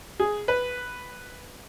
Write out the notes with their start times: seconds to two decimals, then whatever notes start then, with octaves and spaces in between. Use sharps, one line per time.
0.20 G#4
0.48 B4